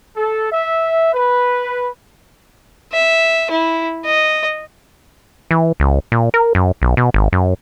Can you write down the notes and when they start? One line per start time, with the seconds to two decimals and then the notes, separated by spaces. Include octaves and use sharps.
0.17 A4
0.52 E5
1.13 B4
2.93 E5
3.51 E4
4.05 D#5
5.51 E3
5.80 C#2
6.12 A#2
6.34 A#4
6.55 F#2
6.82 B1
6.97 B2
7.14 G#1
7.33 F#2